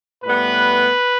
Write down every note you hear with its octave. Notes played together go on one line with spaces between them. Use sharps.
A2 G3 B3 B4